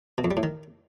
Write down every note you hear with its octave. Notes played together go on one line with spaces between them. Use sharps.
B2
F2
G3
A2
D#3